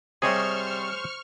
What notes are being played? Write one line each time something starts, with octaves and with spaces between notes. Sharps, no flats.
C3 G3 G#4 C5 C#5 D#5 C#6 F6